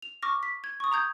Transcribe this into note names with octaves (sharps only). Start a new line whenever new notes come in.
F7
C#6 D6 F6 A#6
B6
G#6
C#6 D#6
A#5 D#6 G6 G#6